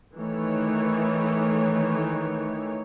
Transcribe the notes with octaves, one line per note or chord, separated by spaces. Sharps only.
D#3 E3 A3 C#5